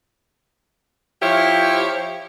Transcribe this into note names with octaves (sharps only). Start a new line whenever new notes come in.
F3 E4 G4 C5 C#5